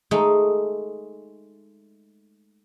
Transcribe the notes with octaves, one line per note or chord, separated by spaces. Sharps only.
G#3 A3 D#4